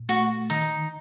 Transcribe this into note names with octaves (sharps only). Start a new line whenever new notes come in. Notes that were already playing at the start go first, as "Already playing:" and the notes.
Already playing: A#2
A3 F#4
D#3 D#4